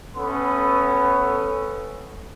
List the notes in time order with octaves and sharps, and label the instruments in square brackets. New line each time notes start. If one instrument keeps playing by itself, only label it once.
[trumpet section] A3 B3 C#4 A4 B5